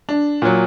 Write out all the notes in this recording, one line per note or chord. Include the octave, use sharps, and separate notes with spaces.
D4
A#2 F#3